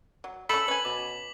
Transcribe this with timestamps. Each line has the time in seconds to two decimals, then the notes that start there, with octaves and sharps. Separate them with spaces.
0.24 F#3
0.49 C#4 A4 B5 B6 F#7
0.68 C#4 B4 G#5 F#7
0.85 B2 D6